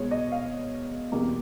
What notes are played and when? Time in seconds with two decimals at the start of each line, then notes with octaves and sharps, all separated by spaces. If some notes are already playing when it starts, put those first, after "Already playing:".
Already playing: B2 G#3 C#5
0.11 D#5
0.32 F5
1.12 E2 B2 G3 A#3